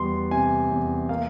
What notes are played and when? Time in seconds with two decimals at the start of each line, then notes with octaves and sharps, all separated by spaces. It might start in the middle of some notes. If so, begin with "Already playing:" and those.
Already playing: E2 G3 C6
0.31 C3 G#5
0.71 E2
1.09 A#3 F5